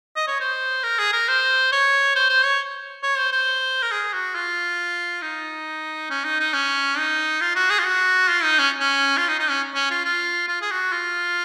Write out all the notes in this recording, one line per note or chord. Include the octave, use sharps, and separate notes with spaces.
D#5
C#5
C5
A#4
G#4
A#4
C5
C#5
C5
C5
C#5
C#5
C5
C5
A#4
G#4
F#4
F4
D#4
C#4
D#4
D#4
C#4
D#4
F4
F#4
G#4
F4
F#4
F4
D#4
C#4
C#4
F4
D#4
D#4
C#4
C#4
F4
F4
F4
G#4
F#4
F4